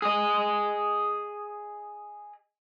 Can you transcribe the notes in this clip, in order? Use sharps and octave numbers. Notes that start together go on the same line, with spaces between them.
G#4 D#5